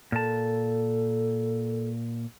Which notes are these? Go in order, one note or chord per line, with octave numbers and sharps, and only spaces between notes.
A#2 A4 A5